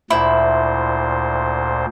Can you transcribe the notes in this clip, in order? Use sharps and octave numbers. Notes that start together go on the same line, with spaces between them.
D2 A#2 E4 C5